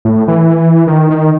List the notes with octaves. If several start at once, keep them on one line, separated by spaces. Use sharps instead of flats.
A2
E3
D#3
D#3